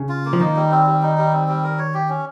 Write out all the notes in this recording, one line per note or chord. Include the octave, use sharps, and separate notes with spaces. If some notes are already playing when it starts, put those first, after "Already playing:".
Already playing: C#3
F4
A#3
F3
D#3 D#4
G3
C4
G3
D#4
G3
C4
G3
A#4
C#5
G4
C#4